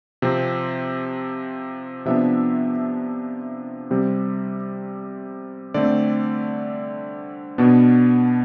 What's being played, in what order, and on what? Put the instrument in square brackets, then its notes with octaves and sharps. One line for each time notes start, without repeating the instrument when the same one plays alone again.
[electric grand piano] C3 F3 C4
C3 F3 B3 D4 E5
C3 G3 C4
D3 A3 C4 D5
B2 B3 D4